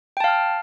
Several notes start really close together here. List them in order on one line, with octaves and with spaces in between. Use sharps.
G5 A5 F5 F6